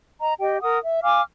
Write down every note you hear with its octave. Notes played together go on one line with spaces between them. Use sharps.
D#5 A#5
G4 D#5 G5
A#4 F#5 D#6
E5
F5 G#5 D6 F6